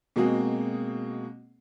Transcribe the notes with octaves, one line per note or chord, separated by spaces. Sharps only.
B2 G#3 A#3 C4 F#4 G#4